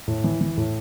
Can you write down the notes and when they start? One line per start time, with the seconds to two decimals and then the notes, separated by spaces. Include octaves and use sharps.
0.08 A2
0.24 E3
0.41 E3
0.57 A2